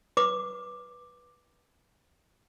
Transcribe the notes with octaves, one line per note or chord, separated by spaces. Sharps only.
B4 D6